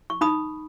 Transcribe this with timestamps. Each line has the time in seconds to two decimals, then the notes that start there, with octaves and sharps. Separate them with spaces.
0.10 C#6
0.21 D#4 B5 D#6